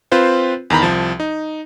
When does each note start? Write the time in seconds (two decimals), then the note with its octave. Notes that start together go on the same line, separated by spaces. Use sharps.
0.12 C4 F4 B4 C5
0.70 E2 D#3 A#5 B5
0.82 C2 F3 A5
1.20 D#4